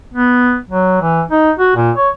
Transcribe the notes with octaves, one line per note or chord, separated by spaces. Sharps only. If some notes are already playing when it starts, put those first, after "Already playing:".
B3
F#3
E3
D#4
F#4
A#2
C#5